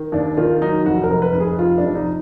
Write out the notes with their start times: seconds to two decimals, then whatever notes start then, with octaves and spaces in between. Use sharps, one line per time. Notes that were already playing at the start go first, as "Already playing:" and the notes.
Already playing: D#3
0.12 D#2 D4
0.37 D#3 F4
0.62 F#3 D#4
0.86 F1 F#4
1.04 A#4
1.11 F1
1.22 B4
1.35 F1
1.40 G#4
1.59 F3 F4
1.78 D4
1.83 F1
1.95 D#4